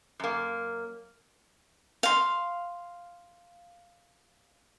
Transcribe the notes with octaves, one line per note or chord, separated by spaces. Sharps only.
F#2 A#3
F5 C6